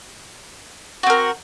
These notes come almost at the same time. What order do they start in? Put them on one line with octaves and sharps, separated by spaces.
F#4 C4 A#4